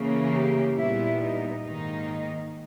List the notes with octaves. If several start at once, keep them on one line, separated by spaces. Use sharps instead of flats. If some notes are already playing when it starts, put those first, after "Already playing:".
Already playing: C#3 E3 A#3
G4
A#2 G3 B3 E4
D#4
G#2 D#3 A#3 D#4